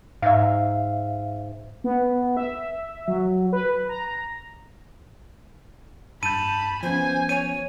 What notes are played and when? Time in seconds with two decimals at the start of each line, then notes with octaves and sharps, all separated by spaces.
0.22 G#2 E5 F5
1.84 B3
2.37 E5
3.08 F#3
3.53 B4
3.89 A#5
6.23 G2 A5 B5 G6 D#7
6.83 F3 B3 C#4 C5 G#5
7.29 C#5 D#7